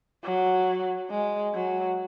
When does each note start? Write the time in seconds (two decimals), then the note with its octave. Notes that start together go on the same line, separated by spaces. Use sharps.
0.24 F#3
1.10 G#3
1.54 F#3